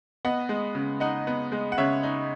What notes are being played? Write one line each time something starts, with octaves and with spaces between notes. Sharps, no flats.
B3 D#5 F#5
G#3
C#3
D#4 D#5 F#5
B3
G#3
F#5
C#3 C#5 E5
D#4